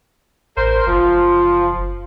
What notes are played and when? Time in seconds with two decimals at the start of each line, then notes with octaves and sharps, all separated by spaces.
0.57 A1 A#4 C5
0.87 F#1 F3